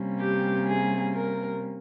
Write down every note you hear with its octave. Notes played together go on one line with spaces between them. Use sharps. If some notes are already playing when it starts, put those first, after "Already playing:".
Already playing: C3 G3 A#3 C#4
G4
G#4
A#4